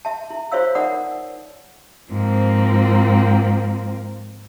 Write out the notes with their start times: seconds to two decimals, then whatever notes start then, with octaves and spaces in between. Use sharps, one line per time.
0.05 E5 A5
0.30 E4
0.52 F4 C5 C#5 E5 F5 E6
0.75 D#4 A#4 D5 F#5 D#6
2.09 G#2 F3 A#3 C4